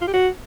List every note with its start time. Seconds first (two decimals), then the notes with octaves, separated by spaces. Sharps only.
0.01 F4
0.07 G4
0.13 F#4